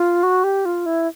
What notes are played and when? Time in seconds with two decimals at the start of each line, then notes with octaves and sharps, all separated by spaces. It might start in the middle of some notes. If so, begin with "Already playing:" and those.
Already playing: F4
0.23 F#4
0.44 G4
0.65 F4
0.86 E4